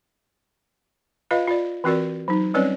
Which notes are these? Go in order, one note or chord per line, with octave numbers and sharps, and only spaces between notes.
F4 B4 D#5 F5
F4 D5
E3 C4 F#4 A#4 D5
F#3 D#4
G3 C4 C#4 B4 C#5 D5